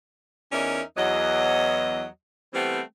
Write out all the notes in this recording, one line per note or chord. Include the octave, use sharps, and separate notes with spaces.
E2 C#4 D#4 A#4 D5 E5
E2 F#3 D#5
E3 G3 A3 B3 C4